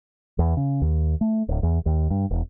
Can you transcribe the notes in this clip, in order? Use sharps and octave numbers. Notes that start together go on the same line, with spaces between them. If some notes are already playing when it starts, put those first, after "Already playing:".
E2
C#3
D#2
A3
D1
E2
D#2
G2
E1